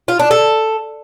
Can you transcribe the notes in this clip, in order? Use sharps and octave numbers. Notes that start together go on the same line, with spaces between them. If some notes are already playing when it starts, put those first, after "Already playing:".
F4
D4
A4